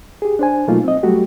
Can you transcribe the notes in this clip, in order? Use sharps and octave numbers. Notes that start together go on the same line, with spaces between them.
G4 G#4
D4 C5 G#5
B2 F#3 A3 A#3 D#4 F4
C4 D#5
F#3 G3 A3 F#4 G4